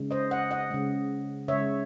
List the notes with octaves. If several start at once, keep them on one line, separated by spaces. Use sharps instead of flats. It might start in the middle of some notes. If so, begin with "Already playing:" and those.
Already playing: C#3 G#3
C5 D#5
D#5 F#5
D#5 F#5
C#3 G#3
C#3 G#3 C#5 E5